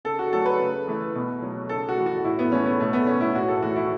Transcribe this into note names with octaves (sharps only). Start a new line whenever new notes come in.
C#3 A4
F#4
F#3 A3 A4
B4
C#3
E3 A3
B2
F#3 A3
C#3 A4
F#4
E3 A3
F#4
A2 E4
B3
E3 A3 C#4
B3
B2 A3
B3
A3 C#4
E4
A2 F#4
A4
E3 A3 F#4
E4